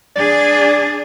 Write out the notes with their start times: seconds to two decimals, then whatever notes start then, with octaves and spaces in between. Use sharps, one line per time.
0.16 D4 G#4 D5